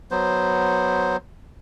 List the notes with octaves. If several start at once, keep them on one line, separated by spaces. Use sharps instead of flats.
F#3 B3 C5